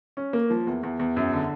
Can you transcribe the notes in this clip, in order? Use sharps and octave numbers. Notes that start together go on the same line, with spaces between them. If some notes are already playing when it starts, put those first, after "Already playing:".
C#4
A#3
F3
E2
E2
E2
F#2
D3